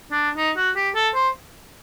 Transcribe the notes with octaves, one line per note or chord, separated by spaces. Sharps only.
D4
D#4
F#4
G4
A4
C5